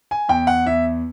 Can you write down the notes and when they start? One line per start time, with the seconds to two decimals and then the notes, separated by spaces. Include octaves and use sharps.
0.11 G#5
0.28 E2 G5
0.47 F#5
0.66 E2 E5